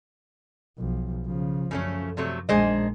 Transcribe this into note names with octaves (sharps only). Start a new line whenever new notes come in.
B1 F3
C#3 F3
F#2 C#3 F3 A3 C#4
C3 F#3 A3
A#1 D#3 G#3 D4 G#4 C5 D#5